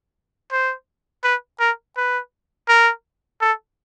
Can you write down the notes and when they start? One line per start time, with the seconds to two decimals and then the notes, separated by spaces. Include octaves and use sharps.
0.52 C5
1.24 B4
1.60 A#4
1.97 B4
2.68 A#4
3.41 A4